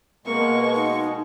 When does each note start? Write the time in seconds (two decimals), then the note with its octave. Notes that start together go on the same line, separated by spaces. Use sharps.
0.26 B2 G#3 A#3 C#6
0.75 D#4